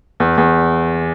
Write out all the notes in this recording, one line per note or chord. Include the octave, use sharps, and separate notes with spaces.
E2
E2